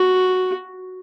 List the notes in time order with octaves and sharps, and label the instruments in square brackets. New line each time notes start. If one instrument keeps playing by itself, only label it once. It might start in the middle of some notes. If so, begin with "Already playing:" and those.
Already playing: [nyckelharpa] F#4